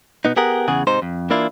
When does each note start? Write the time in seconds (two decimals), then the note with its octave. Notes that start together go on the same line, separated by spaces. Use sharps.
0.25 B2 B3 D#4
0.36 B3 G4 G#4 A#4 F#5
0.68 E2 C#3 G#4 F#5
0.87 G#2 C3 D#4 C5
1.02 F2
1.30 E3 A#3 D4 E4 F4